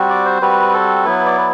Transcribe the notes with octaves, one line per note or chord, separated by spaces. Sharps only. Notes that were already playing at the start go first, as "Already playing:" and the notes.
Already playing: G3 C4 F#4
D5
C5
G3 C4 F#4 B4
A4
F#3 B3 E4 B4
D5
B4